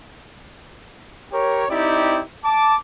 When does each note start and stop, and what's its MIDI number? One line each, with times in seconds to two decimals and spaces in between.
1.32 1.64 67
1.32 1.64 70
1.32 1.64 73
1.70 2.22 60
1.70 2.22 63
1.70 2.22 64
1.70 2.22 67
1.70 2.22 74
2.45 2.76 81
2.45 2.76 86